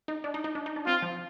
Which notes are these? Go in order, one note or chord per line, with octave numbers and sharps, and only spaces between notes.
D#4
D4
D#4
D#4
D4
D#4
D4
C4 F4
F3